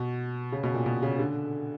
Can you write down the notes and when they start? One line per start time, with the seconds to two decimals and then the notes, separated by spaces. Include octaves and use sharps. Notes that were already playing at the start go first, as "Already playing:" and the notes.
Already playing: B2
0.52 C#3
0.63 B2
0.74 A#2
0.86 B2
1.02 C#3
1.19 D3